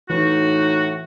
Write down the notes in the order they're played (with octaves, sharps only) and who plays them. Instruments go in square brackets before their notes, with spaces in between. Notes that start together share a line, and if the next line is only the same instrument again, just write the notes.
[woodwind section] A2 D#4 F#4 [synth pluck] E3